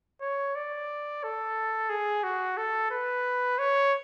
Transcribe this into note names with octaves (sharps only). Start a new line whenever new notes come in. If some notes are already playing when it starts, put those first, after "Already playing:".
C#5
D5
A4
G#4
F#4
A4
B4
C#5